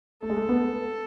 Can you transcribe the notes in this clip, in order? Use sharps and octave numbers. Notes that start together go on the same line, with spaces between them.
A3 A4
G#3
A3
B3